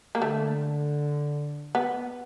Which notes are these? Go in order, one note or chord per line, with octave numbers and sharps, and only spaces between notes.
A#3
D3 A3
B3